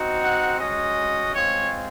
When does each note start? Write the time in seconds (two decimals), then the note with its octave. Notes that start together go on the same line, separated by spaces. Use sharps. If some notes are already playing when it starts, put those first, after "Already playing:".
Already playing: C4 D#4 F#4
0.23 F#5
0.59 G#3 C#4 F#4 D#5
1.34 G#3 C4 F4 C#5